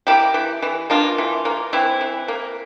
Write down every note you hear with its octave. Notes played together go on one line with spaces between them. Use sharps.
A#3 E4 G4
E3
E3
A#3 D4 F4
E3
A#3
E3 C4 E4
E3
A#3